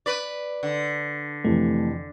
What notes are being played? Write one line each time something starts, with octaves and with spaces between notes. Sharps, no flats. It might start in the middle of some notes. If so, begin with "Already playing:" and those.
B4 D5
D3
F2 C3 E3 A3